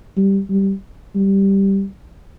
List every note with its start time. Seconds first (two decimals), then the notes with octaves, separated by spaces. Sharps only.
0.17 G3
0.50 G3
1.15 G3